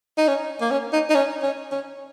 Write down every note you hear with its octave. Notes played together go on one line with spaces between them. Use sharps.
D#4
C#4
A#3
C#4
D#4
D#4
C#4
C#4
C#4